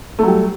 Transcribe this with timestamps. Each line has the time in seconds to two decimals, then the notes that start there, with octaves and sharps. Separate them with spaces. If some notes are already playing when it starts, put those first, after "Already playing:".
0.19 A3
0.23 F#3
0.28 G3